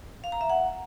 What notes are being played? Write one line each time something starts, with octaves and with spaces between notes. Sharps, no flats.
F5
A#5
E5
F#5